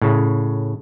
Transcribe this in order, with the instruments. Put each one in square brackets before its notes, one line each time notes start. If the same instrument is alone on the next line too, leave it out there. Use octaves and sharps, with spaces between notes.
[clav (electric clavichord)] A2 C#3